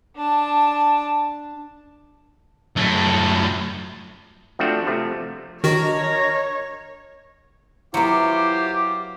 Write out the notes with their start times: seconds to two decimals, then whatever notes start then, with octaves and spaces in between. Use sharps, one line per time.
0.16 D4 A5
2.76 F#2 A3
4.59 F3 A3 C4 D4 F#4
4.87 C3 F3 A3
5.64 D#3 D4 F#4 A#4 C#5 D#5 A#5
7.94 F#3 B3 E4 F4 G4 C5 D6